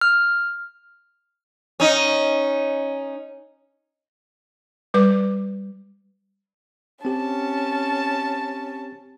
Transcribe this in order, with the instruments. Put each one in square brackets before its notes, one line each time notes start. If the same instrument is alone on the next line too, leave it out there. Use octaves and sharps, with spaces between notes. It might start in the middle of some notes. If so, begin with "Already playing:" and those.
[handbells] F6
[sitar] C#4 D#4
[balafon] G3 B4 D6
[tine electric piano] C4 G4 [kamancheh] C#4 A5